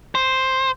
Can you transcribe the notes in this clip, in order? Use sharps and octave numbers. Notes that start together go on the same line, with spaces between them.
C5